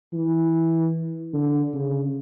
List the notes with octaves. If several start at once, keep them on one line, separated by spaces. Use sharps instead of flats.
E3
D3
C#3